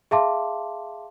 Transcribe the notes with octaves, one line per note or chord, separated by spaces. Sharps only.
G#4 E5 F5 A5 C6 D6